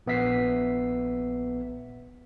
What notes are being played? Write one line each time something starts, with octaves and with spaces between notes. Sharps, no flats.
A#1 B3 E5 B6 C7